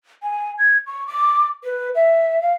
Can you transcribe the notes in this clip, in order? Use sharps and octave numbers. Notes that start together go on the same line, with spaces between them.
G#5
G#6
C#6
D6
B4
E5
F5